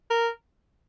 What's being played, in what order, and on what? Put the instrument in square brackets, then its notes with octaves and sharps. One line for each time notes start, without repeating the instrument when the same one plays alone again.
[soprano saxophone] A#4